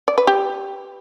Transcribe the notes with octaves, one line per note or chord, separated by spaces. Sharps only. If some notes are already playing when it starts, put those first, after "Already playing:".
D5
B4
G4